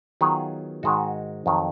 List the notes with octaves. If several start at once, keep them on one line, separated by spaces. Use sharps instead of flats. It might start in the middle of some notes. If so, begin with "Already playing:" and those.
D#3 F#3 B3 F4 G#4
G#2 D#3 G#3 D#4 F#4
F2 D#3 F#3